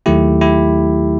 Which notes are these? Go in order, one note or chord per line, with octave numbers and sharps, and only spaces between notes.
D#2 D#3 F#3 A3 E4 G4
E4 G4